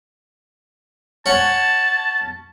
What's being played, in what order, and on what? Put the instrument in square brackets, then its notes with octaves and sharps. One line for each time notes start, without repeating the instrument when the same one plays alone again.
[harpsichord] C#4 F#5 [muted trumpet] A5